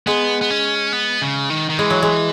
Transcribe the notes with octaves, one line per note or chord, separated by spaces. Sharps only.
G#3 B3
B3
C#4
B3
C#3
D#3
D#3
E3 G#3
F#3
G#3